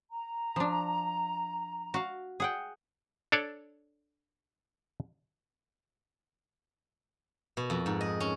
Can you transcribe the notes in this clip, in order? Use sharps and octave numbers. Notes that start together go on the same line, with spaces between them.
A#5
F3 D4
F#4 F5
G#4 F#5 G5
D4 A4 C#5 D5
B2
F2
G#2
D#5
C#4